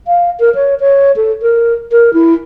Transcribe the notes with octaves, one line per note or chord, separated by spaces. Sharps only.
F5
A#4
C#5
C#5
A4
A#4
A#4
E4